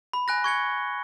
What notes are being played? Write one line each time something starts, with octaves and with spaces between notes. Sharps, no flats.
B5
G#5 F#6 A#6
C#6 G#6 C#7 G7